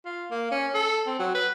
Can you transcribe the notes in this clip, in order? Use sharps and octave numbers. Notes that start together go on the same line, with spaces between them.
F4
A#3
C#4
A4
C4
F#3
B4